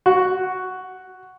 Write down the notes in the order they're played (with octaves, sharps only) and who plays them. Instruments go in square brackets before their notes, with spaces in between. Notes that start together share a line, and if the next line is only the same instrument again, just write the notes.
[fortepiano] F#4